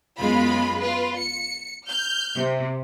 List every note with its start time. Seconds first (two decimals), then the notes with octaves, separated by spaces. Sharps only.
0.18 F#2 G#3 B3 F4 B5
0.79 F4 B4
1.16 C#7
1.86 F6 G6
2.37 C3